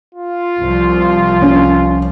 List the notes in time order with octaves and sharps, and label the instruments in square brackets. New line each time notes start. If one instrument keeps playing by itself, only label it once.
[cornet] F4
[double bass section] C2 F3
[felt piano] C#4